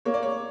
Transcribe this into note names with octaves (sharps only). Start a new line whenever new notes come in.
A#3 C#5
D5
C#5